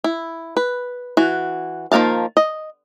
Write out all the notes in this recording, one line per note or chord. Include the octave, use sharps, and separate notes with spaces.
E4
B4
E3 F#4
D#3 F3 A#3 F5 A5
D#5